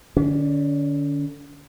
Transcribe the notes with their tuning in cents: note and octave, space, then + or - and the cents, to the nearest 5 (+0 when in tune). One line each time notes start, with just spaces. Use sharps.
D3 +25 C#4 +40